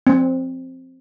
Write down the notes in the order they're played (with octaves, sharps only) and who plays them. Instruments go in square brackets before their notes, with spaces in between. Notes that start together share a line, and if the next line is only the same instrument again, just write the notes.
[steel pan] C4